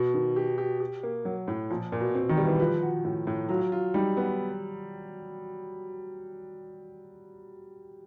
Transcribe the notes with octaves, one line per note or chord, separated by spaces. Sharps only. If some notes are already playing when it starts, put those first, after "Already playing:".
Already playing: B2
D#3
G4
G4
G4
A#3
F#3
A2
A#2 F3
A#2
B2
B2 C4
D#3
G3
E3
F3 B4
F#4
A2
A2
F#3 F4
F4
G3 D#4
B3